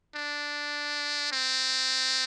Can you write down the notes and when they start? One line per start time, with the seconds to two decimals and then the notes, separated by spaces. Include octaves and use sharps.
0.15 D4
1.32 C4